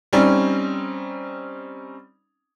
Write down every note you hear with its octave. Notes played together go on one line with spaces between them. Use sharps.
G3 C4 C#4 D#4